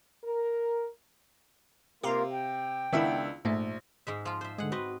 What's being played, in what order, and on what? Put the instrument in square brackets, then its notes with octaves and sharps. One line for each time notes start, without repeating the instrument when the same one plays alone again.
[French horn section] A#4
[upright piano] C3 [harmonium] A#3 F4 A#4 [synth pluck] G4 F5 A#5
[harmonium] G5
[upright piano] C#2 D4 E5 [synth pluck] D#3 B3 E4
[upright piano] A#1 [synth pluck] G#2 A3
[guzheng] G#2 G#3 E5
F3 F4
C5 E5
[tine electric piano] D3 G#3 [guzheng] G#4 F#5
[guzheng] C4 B4 D#5 [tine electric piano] F#4